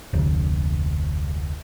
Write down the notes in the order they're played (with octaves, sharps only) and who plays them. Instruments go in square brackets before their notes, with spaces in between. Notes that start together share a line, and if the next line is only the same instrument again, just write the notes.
[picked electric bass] F1 D2